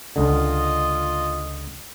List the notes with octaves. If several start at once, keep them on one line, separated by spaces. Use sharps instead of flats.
C#2 D3 F4 D#5